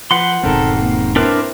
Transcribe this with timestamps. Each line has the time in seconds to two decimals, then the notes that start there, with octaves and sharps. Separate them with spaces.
0.11 F3 B4 F#5 C6
0.43 E1 G#2 D#3 C4 A4 A#4
0.78 A#3
1.16 C4 D4 E4 A#4 B4